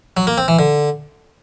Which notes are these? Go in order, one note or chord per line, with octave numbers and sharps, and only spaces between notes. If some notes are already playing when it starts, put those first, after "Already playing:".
F#3
A#3
C4
E3
D3